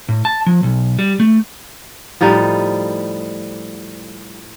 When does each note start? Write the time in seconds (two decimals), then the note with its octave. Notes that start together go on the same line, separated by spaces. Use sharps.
0.09 A2
0.25 A5
0.47 F3
0.63 B1
0.99 G3
1.20 A3
2.21 A2 F3 G3 D#4